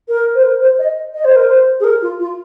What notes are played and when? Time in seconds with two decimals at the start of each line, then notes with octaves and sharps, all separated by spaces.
0.08 A#4
0.35 C5
0.43 A#4
0.61 C5
0.79 D#5
1.14 D#5
1.25 C5
1.36 A#4
1.48 C5
1.80 G#4
1.84 A#4
2.02 F4
2.20 F4